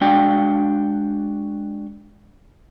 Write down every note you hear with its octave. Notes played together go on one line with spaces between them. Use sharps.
G#3 D4 F#4 G5